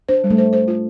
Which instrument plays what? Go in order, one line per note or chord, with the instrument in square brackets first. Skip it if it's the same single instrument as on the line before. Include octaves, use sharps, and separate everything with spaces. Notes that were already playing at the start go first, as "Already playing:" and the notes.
[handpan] D4 [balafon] C5
[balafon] G3
[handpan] A3
[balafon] C5
C5
F4